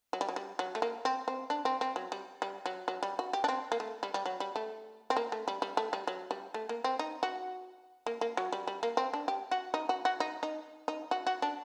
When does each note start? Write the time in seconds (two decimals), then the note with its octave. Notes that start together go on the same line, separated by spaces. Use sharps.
0.13 F#3
0.21 G3
0.29 F#3
0.36 G3
0.59 F#3
0.75 A3
0.82 A#3
1.05 C4
1.28 C4
1.50 D4
1.65 C4
1.81 C4
1.96 F#3
2.12 G3
2.42 G3
2.66 F#3
2.88 F#3
3.03 G3
3.19 F#4
3.33 G4
3.44 D4
3.48 C4
3.72 A#3
3.80 A3
4.03 G3
4.14 G3
4.26 F#3
4.40 G3
4.56 A3
5.10 C4
5.16 A#3
5.32 A3
5.48 G3
5.62 G3
5.77 A3
5.93 G3
6.07 F#3
6.31 G3
6.54 A3
6.69 A#3
6.84 C4
6.99 D#4
7.23 F#4
8.06 A#3
8.21 A#3
8.37 F#3
8.52 G3
8.67 G3
8.83 A#3
8.97 C4
9.13 D4
9.28 G4
9.51 F#4
9.74 D#4
9.89 F#4
10.05 F#4
10.20 D#4
10.43 D#4
10.88 D#4
11.11 F#4
11.27 F#4
11.42 D4